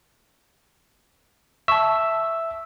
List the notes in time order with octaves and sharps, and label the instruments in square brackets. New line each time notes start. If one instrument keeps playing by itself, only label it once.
[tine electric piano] E5 E6 [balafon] A5 C#6